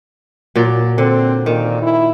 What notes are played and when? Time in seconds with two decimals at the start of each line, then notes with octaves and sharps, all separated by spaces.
0.56 A#2 F#3 D5
0.98 D3 C4
1.46 A#2 D#3
1.83 E4